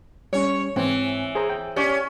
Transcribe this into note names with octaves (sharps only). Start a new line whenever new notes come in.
G3 C#4 C#5
G#2 E3 C4 G#5
G#4 C5 A#5
G5
C#4 G4 C#5 D5